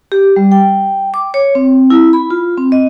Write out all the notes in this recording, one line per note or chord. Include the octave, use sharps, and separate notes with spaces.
G4
G3
G5
D6
C#5
C4
E4
B5
F4
C4
D#5